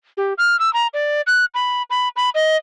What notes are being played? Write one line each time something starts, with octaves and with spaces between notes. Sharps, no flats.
G4
F6
E6
A#5
D5
F#6
B5
B5
B5
D#5